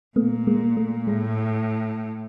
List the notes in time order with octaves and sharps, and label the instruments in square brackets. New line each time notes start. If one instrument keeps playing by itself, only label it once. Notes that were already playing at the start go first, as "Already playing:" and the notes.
[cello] A#2 [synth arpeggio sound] A3 B3
[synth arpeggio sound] G#3 A#3
A3
[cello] A2 [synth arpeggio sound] G#3